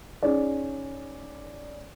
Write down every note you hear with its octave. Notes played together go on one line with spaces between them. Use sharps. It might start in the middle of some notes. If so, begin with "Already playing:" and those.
C#4 D#4 G#4 C#5 D5